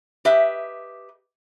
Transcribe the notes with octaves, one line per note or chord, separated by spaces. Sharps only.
G4 B4 D#5 E5